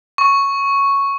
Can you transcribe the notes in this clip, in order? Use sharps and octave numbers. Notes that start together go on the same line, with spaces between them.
C#6